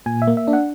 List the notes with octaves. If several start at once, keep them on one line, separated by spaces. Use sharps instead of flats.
A#2 G#5
E5
A#3
E5
D4
F#5